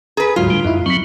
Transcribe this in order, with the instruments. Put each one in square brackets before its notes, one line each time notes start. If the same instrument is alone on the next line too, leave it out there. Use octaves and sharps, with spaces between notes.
[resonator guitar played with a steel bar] G#4 B4 [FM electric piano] A#5 B6
[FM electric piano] D2 G#2 F#3 [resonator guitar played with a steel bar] F4
[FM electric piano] A2 D3 [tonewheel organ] G3
[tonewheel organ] F#2 [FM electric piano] D#4 E4
[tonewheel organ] F#3 C4 [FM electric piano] C#6 B6